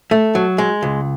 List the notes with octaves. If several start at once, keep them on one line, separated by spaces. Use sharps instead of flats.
A3
F#3
G#3
C#2